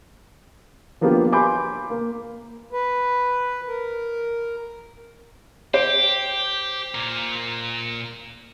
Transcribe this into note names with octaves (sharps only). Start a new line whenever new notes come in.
F3 A#3 B3 D4 F4 G4
G#5 B5 C6 D6 G6
A#3
B4
A#4
G4 C5 D7
A#2 A#4